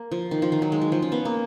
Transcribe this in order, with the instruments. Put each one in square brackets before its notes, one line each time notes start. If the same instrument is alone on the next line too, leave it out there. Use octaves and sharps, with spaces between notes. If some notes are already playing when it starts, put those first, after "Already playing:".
Already playing: [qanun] A#3
F3
D#3
F3
D#3
F#3
G#3
F#3
F3
C#4
B3
A#3